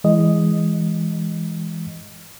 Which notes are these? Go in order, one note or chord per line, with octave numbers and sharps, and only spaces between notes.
E3 G#3 D#5